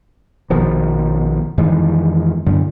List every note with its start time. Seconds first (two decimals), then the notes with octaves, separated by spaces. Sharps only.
0.50 A#1 B2 D#3 F3
1.58 F2 D#3 E3 G#3
2.46 F#2 D3